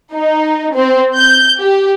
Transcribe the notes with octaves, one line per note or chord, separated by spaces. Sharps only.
D#4
C4
G6
G4